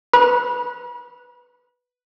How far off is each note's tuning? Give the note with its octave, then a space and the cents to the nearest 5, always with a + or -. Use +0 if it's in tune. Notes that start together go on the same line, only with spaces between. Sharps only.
B4 +0 B5 -40